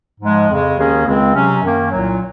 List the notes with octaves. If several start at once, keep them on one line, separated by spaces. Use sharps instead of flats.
G#2 F3 G#3
F2 C#3 G#3
D#2 D#3 A#3 C#4 G#4
C#2 C#3 G#3 C4
C3 F#3 C#4
F#2 D#3 A#3
C2 A#2 F#3